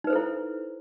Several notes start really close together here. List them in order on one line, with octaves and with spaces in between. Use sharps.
D#4 B4 C5 A4 E4